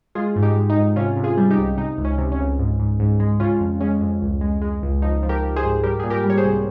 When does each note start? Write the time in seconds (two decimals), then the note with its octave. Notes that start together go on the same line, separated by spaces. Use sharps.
0.15 G#3 F4 G#4
0.36 G#2
0.43 D#4 G4
0.56 G#3
0.70 D#4
0.76 G#2
0.96 C3 C#4 F4
1.17 C3
1.24 F4 G#4
1.37 G3
1.51 D#4 G4
1.58 C2
1.78 C3 D#4
1.98 C#2
2.05 C#4
2.18 C3
2.32 C#4
2.39 C#2
2.59 G#2
2.79 G#2
2.99 G#2
3.20 G#3
3.40 C#3 C#4 F4
3.60 F2
3.80 G#3 C#4
4.01 F2
4.21 C#2
4.41 G#3
4.62 G#3
4.82 C#2
5.02 F3 D#4
5.23 F3
5.29 G4 A#4
5.43 F3
5.56 G#4 C5
5.63 G#2
5.83 G3 G4 A#4
6.00 A#2 G#4
6.10 G4 A#4
6.24 G3
6.30 C#5
6.38 G#4 C5
6.44 C2